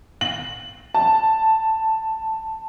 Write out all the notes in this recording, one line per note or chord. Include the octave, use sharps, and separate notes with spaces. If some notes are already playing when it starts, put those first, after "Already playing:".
F#7
A5